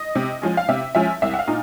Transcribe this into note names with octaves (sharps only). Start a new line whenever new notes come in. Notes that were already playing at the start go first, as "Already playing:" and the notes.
Already playing: D#5
C3
F3 G#3 C#4
F5
C3 E5
F3 G#3 C#4 E5
C2 E5
F#5
F5
A#2 D#4